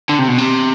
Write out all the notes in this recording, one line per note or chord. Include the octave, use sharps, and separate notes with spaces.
D3
C3
B2
C3